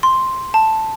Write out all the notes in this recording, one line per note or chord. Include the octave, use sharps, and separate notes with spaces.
C6
A5